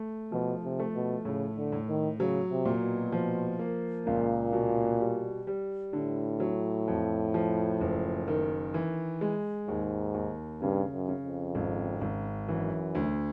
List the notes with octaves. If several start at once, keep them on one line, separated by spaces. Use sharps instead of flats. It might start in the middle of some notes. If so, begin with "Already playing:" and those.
Already playing: A3
B2 F3
C3
A3
B2
A2 C#3
D3
A2
D#3
C#3 F#3
C3
A#2
B2
F3
A#3
C#2 A#2
B2
G3
G3
A2 D3
F#3
F2
F3
F#1
D#3
E3
G#3
D#2 G#2
D#2
G2 C#3
F#2
C#3
F2
G#1
G#1
F#2 E3
D2